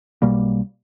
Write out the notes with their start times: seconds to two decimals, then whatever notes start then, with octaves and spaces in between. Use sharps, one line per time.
0.22 B1 B2 G3 A#3